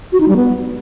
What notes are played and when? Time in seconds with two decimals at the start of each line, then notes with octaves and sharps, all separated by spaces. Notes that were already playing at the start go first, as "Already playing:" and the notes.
0.12 F#4
0.20 D#4
0.28 G3
0.36 B3